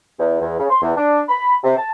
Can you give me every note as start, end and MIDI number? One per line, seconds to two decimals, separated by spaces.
0.18 0.38 40
0.41 0.58 40
0.58 0.66 49
0.70 0.79 84
0.82 0.92 40
0.96 1.21 62
1.28 1.55 83
1.63 1.76 48
1.77 1.91 81